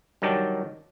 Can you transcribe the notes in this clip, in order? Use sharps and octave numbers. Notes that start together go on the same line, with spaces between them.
G2 D#3 F#3 D5 G5 A5